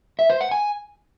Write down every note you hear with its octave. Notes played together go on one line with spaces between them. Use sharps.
E5
C5
F#5
G#5